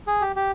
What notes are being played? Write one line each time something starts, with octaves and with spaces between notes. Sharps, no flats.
G#4
G4
G4